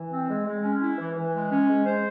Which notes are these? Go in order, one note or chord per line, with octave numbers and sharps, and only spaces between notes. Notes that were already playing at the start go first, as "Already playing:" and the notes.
Already playing: E3
C4
G#3
G#3
C#4
E4
E3
E3
G#3
C#4
G#3
C5